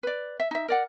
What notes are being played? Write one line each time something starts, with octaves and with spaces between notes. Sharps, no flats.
B4 D5
E5
D#4 E5
A#4 D5 F#5